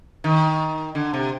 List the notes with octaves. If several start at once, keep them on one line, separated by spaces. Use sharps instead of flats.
D#3
D3
C3